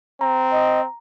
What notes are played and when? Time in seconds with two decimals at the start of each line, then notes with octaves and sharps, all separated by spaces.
0.21 C4 A#5
0.52 D#5